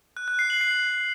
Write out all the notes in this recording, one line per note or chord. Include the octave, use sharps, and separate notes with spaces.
F#6
F#6
C7
F#7
C7